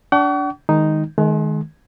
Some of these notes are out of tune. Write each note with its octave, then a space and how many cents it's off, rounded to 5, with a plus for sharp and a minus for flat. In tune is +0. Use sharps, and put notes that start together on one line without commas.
D4 -25 F#5 +45 C#6 +45
D#3 +5 G#3 +0 D#4 +0
D#3 +0 G#3 +40